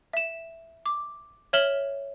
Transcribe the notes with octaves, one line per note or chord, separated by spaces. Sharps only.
E5 E7
D6
C#5 E5 F6 E7 F#7 G7